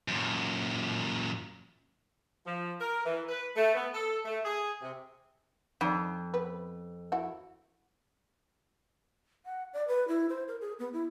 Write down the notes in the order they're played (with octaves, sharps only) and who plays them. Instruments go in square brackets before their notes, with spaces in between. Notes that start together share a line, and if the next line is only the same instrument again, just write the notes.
[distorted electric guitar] F#2 A#2
[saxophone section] F3
A#4
E3
B4
A3
B3
A4
A3
G#4
C3
[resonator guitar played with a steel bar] F2 [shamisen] D#4 D5
[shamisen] B3 C4 B4
E4 F#4
[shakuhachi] F#5
D5
B4
E4
C5
A#4
G#4
B3
E4